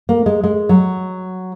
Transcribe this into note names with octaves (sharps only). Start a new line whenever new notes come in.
A#3
G#3
G#3
F#3